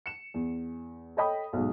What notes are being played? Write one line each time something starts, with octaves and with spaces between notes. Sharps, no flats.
C#7 E7
E2
A4 C#5 D#5 G5 B5 D#6
B1 G#2